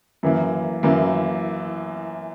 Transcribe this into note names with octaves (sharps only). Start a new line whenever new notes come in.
F#2 E3 A#3
F#2 E3 A#3